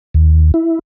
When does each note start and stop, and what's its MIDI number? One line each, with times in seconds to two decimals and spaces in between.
0.14 0.52 39
0.54 0.79 64